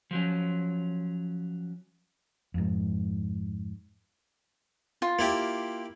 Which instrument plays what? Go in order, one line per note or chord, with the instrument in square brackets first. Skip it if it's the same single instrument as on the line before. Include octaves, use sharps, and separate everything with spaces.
[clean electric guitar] F3 F#3 C#4
[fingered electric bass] F2 G#2
[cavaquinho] F4
[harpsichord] A#3 E4 G4